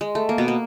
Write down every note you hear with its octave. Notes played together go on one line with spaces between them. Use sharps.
G#3
A3
A#3
B2 B3
A#3